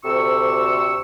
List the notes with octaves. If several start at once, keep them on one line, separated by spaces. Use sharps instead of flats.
D2 C3 C#6 E6